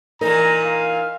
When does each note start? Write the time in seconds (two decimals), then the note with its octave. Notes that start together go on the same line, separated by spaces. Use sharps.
0.21 A#2 E3 D#4 A#4 A#5
0.65 F5